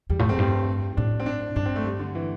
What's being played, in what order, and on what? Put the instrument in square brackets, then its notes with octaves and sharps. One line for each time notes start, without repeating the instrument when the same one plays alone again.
[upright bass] E2 [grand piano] G3
[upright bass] A2 [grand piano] A3
[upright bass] E2 [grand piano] C4
[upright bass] G2
[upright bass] A2 [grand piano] D4
[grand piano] C4
D4
[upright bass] G2 [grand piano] D4
[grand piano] C4
A3
G3
D3
E3